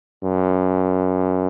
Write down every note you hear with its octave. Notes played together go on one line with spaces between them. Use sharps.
F#2